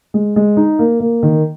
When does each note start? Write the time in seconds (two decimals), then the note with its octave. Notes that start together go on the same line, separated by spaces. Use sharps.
0.14 G#3
0.36 G#3
0.57 D#4
0.79 A#3
1.00 A#3
1.23 D#3